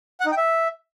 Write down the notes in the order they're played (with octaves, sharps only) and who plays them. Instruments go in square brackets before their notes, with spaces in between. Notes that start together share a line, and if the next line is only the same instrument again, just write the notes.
[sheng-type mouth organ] F#5
D#4
G5
E5